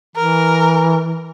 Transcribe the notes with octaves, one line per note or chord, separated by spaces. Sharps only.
E3 A#4